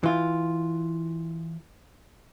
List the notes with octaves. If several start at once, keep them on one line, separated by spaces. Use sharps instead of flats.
E3 F4